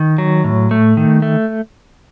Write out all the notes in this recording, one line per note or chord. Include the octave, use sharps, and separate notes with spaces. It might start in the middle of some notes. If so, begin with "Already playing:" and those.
Already playing: D#3
F#3
A2
A3
D#3
A3